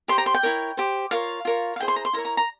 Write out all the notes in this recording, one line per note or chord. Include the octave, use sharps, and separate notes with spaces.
G4 C5 C6
A#5
C6
G5
E4 A#4 C#5
G4 C5
F4 A#4 C#5 F5
F4 A#4 C#5
F5
E4 G#4 C5 G5
C6
A#5
C6
E4 A#4 C#5 A#5
A#5
A#5